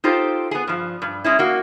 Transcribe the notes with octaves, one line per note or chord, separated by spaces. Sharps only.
D#4 F4 G4 A4 C5
B3 G#4
G2 F3
G2
G#3 C#4 E4
A#3 F#4